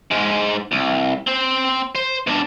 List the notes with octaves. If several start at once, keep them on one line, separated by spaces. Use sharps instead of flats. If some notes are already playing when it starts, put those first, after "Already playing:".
G#2 G#3
C2
C4 C5
C5
B2 D4